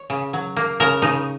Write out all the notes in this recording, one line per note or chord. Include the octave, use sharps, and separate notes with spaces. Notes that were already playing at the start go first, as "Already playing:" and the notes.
Already playing: C#5
C#3
F#3
A#3
C#3 A#4
C#3 D#4